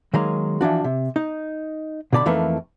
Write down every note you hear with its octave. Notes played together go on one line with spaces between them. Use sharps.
D#3 F#3 G#3 A#3 A#5
E3 F3 D4 F#4
C3
D#4
B2 D3 D5 A#5 B5
F2 E3 A3 A#3 D#4 B4